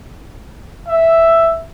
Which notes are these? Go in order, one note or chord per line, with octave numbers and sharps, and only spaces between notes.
E5